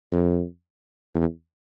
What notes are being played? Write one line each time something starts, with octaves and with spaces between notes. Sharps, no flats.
F2
E2